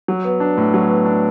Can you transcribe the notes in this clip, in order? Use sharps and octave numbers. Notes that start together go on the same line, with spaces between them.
F#3
B3
D4
A2
F#3
B3
D4